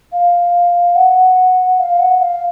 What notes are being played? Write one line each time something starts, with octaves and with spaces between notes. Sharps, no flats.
F5
F#5
F5
F#5
F5